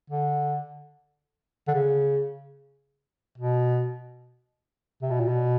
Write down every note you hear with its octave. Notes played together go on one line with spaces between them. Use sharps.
D3
D3
C#3
B2
C3
B2
A#2
B2